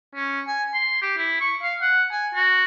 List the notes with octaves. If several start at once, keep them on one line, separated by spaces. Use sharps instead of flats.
C#4
G#5
C6
G4
E4
C#6
F5
F#5
G#5
F#4